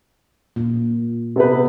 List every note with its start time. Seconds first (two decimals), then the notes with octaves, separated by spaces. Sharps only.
0.56 A#2
1.36 C3 B3 B4